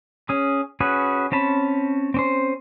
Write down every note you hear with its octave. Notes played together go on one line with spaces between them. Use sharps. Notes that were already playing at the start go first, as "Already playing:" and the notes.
C#4 G#4
C#4 F#4 G#4 B4
C4 C#4 A5 B5
C4 C#4 C5